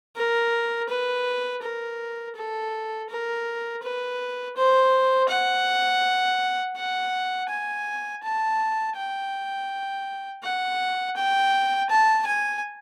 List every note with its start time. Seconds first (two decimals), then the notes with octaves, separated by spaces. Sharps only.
0.16 A#4
0.89 B4
1.62 A#4
2.35 A4
3.09 A#4
3.82 B4
4.56 C5
5.29 F#5
6.76 F#5
7.49 G#5
8.23 A5
8.96 G5
10.43 F#5
11.16 G5
11.89 A5
12.26 G#5